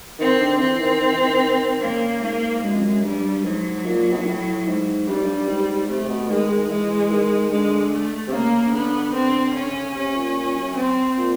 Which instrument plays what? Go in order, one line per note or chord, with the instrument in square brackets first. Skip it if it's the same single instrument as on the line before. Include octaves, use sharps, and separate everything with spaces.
[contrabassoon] D#3 [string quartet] C4
[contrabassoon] D3
[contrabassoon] E3 [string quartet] C4
[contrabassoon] D#3
D#3
E3
D#3
D#3
[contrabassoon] C#3 [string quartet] A#3
[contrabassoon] G#2 [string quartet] A#3
[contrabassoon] F#2 [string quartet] G#3
[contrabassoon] F2
F#2
[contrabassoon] G2 [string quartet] G3
[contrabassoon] G#2 [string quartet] F#3
[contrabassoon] A#2
B2
A#2
A2
G#2
[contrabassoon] G2 [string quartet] G3
[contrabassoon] G#2
G2
G#2
[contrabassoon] C3 [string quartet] A3
[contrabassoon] C3
B2
[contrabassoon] D#3 [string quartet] G#3
[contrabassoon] D#3
D#3
[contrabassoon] E3 [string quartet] G#3
[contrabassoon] D#3
[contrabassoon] D3 [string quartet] G#3
[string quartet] A3
[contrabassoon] C3
[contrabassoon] C#3 [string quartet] A#3
[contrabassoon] C#3
[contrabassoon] D3 [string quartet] B3
[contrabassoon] D3 [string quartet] C4
[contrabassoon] C#3 [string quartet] C#4
[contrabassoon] D3
C#3
[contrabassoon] C3 [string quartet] C#4
[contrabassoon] A#2
A#2
F#2
[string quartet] C4
[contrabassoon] A#2